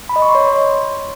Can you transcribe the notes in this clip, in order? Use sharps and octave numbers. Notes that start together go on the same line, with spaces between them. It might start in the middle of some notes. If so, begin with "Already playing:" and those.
B5
D#5
C#6
C6
C#5